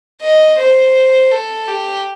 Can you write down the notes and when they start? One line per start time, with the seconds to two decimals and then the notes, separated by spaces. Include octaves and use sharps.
0.22 D#5
0.58 C5
1.31 A4
1.68 G4